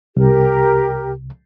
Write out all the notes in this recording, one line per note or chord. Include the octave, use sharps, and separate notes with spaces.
C2 G4 A#4